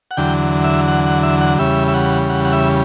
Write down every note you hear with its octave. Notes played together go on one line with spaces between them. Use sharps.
F#5
E2 D3 F#3 G5
E5
F#5
F#5
E5
F#5
E2 C#3 G3 E5
E5
F#5
F#5
F#5
E5